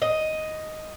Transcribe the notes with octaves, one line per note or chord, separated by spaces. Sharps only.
D#5